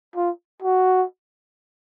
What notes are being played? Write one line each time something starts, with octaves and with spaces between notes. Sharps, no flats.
F4
F#4